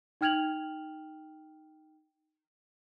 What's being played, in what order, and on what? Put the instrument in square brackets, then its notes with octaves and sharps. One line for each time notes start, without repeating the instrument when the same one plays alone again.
[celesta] D#4 G5 F6 G#6 F7 F#7